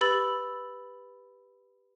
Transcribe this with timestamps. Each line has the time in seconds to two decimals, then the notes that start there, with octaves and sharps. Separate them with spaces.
0.01 G4 B4 B5 E6 A6 F#7